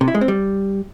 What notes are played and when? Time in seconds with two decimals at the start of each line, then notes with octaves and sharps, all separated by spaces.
0.01 C3
0.08 E4
0.15 G#3
0.21 C4
0.28 G3